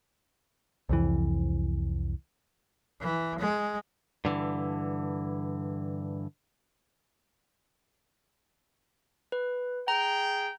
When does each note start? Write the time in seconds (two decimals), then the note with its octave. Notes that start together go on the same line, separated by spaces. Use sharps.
0.89 C2 F2 E3
3.00 E3
3.39 G#3
4.25 G2 D3 E3
9.32 B4
9.88 G#4 G5 A#5